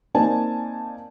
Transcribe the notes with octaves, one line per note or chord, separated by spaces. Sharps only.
A#3 C4 D#4 D5 G#5 A5